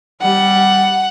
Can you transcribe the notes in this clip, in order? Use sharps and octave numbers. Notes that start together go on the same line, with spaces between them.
G3 F#5